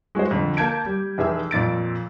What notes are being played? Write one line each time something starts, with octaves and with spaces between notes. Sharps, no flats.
G#3 F#4 G#4 C5
F2 D3
A#3 A5 G6 G#6 D7
G3
F1 E3 G#4 E5 E6
F2 A#2 A6 D7